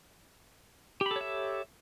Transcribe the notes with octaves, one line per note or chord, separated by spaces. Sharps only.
G4 A4 C#5 E5 B5